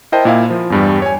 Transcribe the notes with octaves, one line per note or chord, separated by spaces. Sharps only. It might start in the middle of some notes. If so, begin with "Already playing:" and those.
E4 A#4 C5 D#5 G5 A5
A#2 E4 F5
F3
E2 G2 G3
C#5 G#5